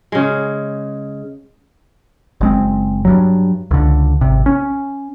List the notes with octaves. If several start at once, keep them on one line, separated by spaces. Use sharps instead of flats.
C#3 G#3
F#1 G#3 C4
G2 F#3
C#2 D3
G#1 C3
C#4